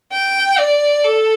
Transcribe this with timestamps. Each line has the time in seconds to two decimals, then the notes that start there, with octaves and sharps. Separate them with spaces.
0.13 G5
0.59 D5
1.04 A4